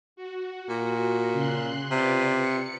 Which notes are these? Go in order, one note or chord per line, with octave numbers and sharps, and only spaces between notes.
F#4
A#2
C#3 C6 F#6
C3 F4 B4 D5
C#7